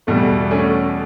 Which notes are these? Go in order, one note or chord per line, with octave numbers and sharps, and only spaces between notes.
E2 B2 G3 A3
A3 C#4